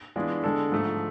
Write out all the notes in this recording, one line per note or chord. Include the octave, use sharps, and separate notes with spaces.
E3 G#3 B3 D4 F4
D3 G#3 D4 A4
G#2 F3 A3